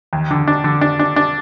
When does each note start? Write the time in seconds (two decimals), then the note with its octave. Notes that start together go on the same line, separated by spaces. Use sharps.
0.13 D#2
0.31 D3
0.47 D4
0.64 D3
0.81 D4
0.99 D4
1.16 D4